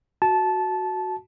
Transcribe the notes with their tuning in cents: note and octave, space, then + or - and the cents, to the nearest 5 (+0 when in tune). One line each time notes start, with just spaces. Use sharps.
F#4 +0 A5 -15